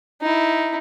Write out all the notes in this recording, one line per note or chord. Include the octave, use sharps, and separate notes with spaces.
D#4 E4